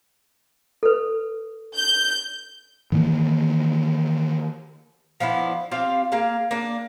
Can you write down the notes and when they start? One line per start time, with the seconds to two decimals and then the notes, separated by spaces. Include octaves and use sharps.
0.83 A4 B4
1.77 G6
2.92 D#3 E3 G#3 A#3
5.20 F3 B3 D4 E4
5.71 C4 F4 G4 F5
6.12 A#3 G#4 F5
6.51 A#3 D4